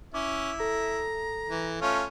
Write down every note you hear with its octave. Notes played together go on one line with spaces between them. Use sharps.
C#4 E4 D6
A4 A#5
E3
A3 C#4 F4